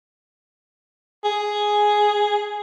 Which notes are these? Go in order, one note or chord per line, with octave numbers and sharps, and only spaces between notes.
G#4